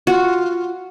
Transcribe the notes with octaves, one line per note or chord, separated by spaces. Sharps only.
F4 F#4